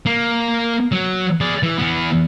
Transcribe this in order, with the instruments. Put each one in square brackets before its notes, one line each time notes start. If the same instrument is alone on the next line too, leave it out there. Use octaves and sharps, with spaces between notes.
[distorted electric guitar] A#3
F#3
G#4 D5
E3
E3 B3